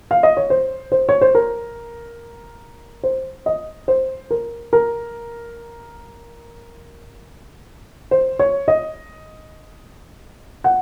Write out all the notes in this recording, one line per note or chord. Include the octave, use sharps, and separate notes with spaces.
F5
D#5
C#5
C5
C5
C#5
C5
A#4
C5
D#5
C5
A#4
A#4
C5
C#5
D#5
F#5